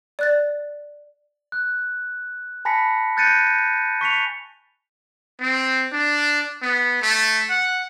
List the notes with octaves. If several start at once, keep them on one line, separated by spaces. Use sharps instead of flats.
D5 F#6 A6
F#6
G#5 A5 B5 A#6 B6 C#7
F#6 G6 A6 A#6 C#7 D#7
C#6 B6 C#7 F7
C4
D4
B3
A3
F#5